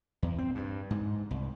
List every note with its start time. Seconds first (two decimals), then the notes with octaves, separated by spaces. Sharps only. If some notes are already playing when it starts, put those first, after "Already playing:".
0.22 E2
0.38 C4
0.55 G2
0.90 G#2
1.31 C2